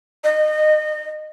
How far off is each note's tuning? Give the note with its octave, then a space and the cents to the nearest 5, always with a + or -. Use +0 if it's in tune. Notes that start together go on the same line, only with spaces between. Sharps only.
D#5 -25